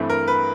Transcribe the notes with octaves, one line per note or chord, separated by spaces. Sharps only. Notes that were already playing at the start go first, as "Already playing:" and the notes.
Already playing: G2 E3 A3 C4
A#4
B4